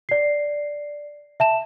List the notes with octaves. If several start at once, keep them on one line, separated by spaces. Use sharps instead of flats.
D5 C7
E5 A5 E7